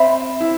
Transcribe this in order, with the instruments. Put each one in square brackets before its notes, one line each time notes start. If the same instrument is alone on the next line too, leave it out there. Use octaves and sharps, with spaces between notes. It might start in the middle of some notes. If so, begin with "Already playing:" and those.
Already playing: [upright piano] C4 [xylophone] E5 B5
[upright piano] E4